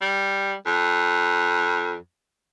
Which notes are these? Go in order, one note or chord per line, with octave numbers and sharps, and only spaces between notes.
G3
F2